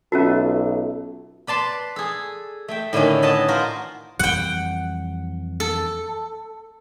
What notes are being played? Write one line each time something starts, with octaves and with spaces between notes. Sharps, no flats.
B1 C#4 F4 F#4 A4 E5
B4 D5 A5 C6
G#4 A4
A3 E5 G5
A2 D3 D#3 A3 C#4
B4 C#5 D#5 F#5 A5
F4 F#4 A#4 C5
F2 E3 G3 F#5 G5
A4